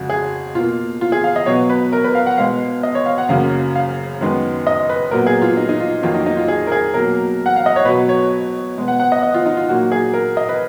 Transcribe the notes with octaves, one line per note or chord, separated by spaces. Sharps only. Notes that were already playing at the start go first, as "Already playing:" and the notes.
Already playing: F2 C#3 G#3 F#4
G#4
B2 A#3 F4
F4
G#4
F5
D#5
B2 F#3 B3 C#5
B4
A#4
B4
F5
F#5
B2 G#3 B3 F5
D#5
C#5
F5
F#5
F#2 C#3 F#3 A#3 F5
F5
F#2 D#3 G#3 B3
D#5
B4
A#2 F#3 B3 A#4
G#4
F4
D#4
D#4
F4
F2 D#3 F#3 A#3 F4
D#4
D#4
F4
G#4
A#4
G#4
B2 F#3 A#3 A#4
F#5
F5
D#5
C#5
B2 F#3 B3 B4
C#5
B2 G#3 B3
F#5
F#5
D#5
D#5
F4
D#4
F4
A#2 F#3 A#3 F#4
G#4
A#4
D#5
B4